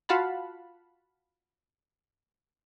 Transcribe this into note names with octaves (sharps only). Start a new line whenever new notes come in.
F4 F#4 F5 F#5 A5 B5